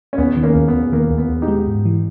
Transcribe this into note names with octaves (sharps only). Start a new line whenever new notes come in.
C#4
D#2 B3
D#3
A#3 C#4
D#2
B3
D#2
D#3 A#3
D#2
B3
D#2
D#4 G4
G#3
G#2
E3